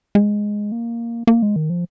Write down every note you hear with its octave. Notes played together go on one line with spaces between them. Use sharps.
G#3
A#3
A#3
G#3
D#3
F3